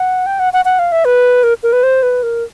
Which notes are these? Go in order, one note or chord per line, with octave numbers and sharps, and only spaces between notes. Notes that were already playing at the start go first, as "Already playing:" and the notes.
Already playing: F#5
G5
F#5
F#5
F#5
F5
E5
B4
A#4
A#4
B4
C5
B4
A#4